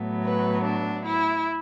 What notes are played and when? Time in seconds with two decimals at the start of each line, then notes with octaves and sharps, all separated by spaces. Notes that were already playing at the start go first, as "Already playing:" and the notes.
Already playing: A2 F#3 B3
0.23 B4
0.63 D4
1.05 E4